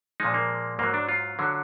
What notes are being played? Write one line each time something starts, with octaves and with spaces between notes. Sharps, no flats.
A#2 F3 G#3 D#4
A#3
G#2 F#3 A#3
D4
F4
D3 F#3